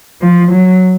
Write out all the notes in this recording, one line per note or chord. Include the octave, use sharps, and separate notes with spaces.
F3
F#3